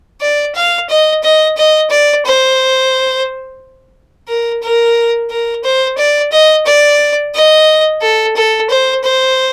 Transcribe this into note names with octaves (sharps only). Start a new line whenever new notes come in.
D5
F5
D#5
D#5
D#5
D5
C5
A#4
A#4
A#4
C5
D5
D#5
D5
D#5
A4
A4
C5
C5